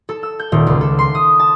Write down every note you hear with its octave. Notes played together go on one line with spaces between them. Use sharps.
A4
E6
G6
D#1
C#2
A4
C6
D#6
A5